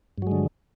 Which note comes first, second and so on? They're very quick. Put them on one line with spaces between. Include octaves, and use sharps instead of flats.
G2 F#3 G#3 D3